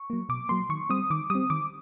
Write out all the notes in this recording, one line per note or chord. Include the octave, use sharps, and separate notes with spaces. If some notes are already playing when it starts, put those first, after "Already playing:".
Already playing: C#6
F#3 A#3
B2 D6
F#3 A#3 C6
D#3 C#6
G3 C4 D#6
D#3 D6
G3 C4 D#6
D#3 D6